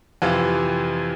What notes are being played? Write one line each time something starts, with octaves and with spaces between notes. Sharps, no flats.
F2 C3 E3 F4